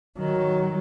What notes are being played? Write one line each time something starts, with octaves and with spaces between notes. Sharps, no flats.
D#3 F#3